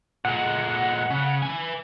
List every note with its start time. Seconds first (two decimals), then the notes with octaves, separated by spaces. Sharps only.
0.25 A#2 G#3 F#5
1.10 C#3
1.43 B4 G#5